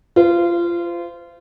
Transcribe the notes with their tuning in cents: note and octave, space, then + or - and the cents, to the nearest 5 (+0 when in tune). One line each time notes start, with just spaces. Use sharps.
F4 -25 C5 -30